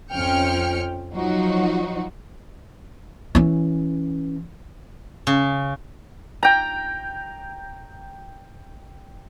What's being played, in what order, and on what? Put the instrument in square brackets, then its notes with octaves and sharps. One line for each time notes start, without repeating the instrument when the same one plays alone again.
[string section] F2 F3 C#4 G5 F6 C#7
F3 F#3 D#4 F#4
[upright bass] E3 C#4
[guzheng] C#3
[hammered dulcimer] G5 A#5